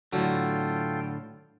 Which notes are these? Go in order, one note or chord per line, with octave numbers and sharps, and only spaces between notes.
A2 D3 F#3 F4 A4 G5